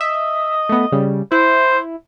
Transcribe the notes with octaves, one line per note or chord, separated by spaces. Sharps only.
D#5 E5
A3 B3
C#3 G3
E4 C5